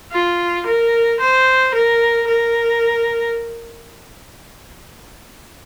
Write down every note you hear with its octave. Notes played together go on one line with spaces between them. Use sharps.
F4
A#4
C5
A#4
A#4